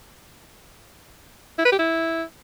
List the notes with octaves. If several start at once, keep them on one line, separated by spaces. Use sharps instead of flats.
E4
B4
G4
E4